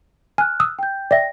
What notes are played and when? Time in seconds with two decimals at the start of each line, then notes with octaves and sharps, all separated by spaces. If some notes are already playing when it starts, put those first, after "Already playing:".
0.38 G#5 F6 F#6
0.60 D#6 E6
0.79 G5 G6
1.11 D5 E5 G5 A#6